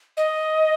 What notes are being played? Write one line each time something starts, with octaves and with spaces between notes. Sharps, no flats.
D#5